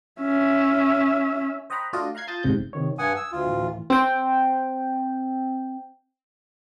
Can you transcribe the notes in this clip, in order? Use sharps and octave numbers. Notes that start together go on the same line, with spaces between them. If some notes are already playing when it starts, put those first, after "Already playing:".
C#4 E5
C5 D#5 F#5 G5 A#5 B5
A3 D4 F4 F#4 D5 D#5
F5 A#5 F#6 G#6 C7
F4 A5 D#6 G6 A6
G1 G#2 C3 C4 G6
C3 D#3 C#5
G2 F#5 G#5 D#6 G#6
E6
D2 F4
A2 E3
C4 G5